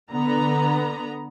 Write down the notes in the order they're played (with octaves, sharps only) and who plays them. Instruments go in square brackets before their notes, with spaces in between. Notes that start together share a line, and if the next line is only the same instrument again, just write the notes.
[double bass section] D3 [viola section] B3 A#5